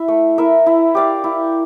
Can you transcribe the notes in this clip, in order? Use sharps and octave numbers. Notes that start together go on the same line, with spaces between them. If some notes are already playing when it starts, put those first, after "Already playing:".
Already playing: E4 E5
A3
E4 A#4 E5
E4
G4 D5 F5
E4